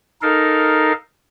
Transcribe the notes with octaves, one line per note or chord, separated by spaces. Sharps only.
D#4 A4 A#4 F5